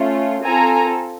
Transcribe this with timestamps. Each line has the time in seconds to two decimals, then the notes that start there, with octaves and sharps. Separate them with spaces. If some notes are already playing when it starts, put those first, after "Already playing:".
Already playing: A3 C#4 F4
0.45 C4 F4 A4 G#5 A#5